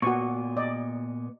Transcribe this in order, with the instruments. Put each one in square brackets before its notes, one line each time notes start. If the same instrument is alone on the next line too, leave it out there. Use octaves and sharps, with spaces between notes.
[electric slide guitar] A#2 B3 [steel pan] F#4 C#6
[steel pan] D5 D#5